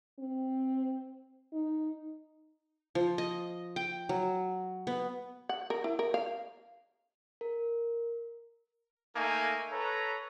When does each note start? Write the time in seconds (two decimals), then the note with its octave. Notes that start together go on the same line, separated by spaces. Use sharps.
0.19 C4
1.53 D#4
2.95 F3
3.18 D#5
3.76 G5
4.09 F#3
4.87 B3
5.49 F#5
5.70 A#4
5.84 E4
5.99 A#4
6.14 F5
7.41 A#4
9.16 A3 A#3 D#4 G#5
9.72 A4 B4 C#5 A#5